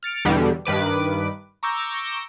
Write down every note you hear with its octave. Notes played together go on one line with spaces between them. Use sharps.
F6 A6 C#7 D7
E2 B2 D3 G3
G2 D#3 B4 D6
A#5 C#6 D6 E6 G6 A#6